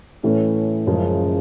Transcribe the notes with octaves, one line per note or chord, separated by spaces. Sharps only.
A2 E3 A3 C#4
F#1 F#2 C#3 F3 G#3